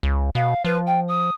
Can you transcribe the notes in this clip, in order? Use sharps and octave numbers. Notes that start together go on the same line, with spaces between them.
C#2
B2 F5
F3 B4
G5
D#6